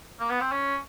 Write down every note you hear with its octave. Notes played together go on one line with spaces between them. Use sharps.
A#3
B3
C4
C#4